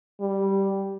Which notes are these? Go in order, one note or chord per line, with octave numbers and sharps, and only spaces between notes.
G3